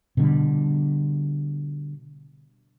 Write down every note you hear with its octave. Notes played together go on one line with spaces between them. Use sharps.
B2 D3 G3